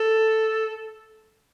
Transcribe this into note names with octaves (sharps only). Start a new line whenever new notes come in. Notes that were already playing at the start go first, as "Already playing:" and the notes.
Already playing: A4